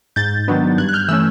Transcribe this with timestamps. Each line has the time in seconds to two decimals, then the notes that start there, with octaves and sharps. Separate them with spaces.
0.16 G#2 G6 A6
0.48 D#3 F#3 B3 D4
0.78 G2 F#6 G#6
0.89 F#6
0.93 F6 G6
1.08 E3 A3 C#4 E6 F#6